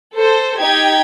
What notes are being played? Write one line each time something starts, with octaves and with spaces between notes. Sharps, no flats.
A4 C5
D#4 G4 G5 G#6